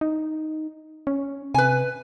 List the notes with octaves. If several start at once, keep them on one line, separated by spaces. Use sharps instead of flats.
D#4
C#4
C3 B4 G#5